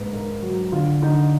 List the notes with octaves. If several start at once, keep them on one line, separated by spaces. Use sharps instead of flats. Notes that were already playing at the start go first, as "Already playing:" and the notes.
Already playing: G#2 A#3 B4
G#2 A#4
F#3
D3 F4
D3 D#4